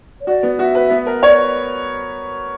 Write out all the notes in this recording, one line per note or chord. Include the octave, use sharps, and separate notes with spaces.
C#5
F#4 D5
B3
F#4 E5
B4
B3
A#4
C#5 D5